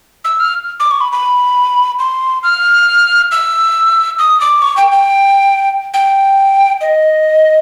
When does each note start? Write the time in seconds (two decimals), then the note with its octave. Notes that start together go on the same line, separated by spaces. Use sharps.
0.25 E6
0.40 F6
0.80 D6
0.91 C#6
1.01 B5
1.12 B5
1.99 C6
2.43 F6
3.32 E6
4.19 D#6
4.41 D6
4.62 C#6
4.77 G5
4.92 G5
5.94 G5
6.81 D#5